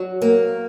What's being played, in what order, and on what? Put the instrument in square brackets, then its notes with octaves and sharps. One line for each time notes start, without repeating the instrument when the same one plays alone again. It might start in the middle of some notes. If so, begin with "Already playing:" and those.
Already playing: [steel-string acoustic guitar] F#3
A#3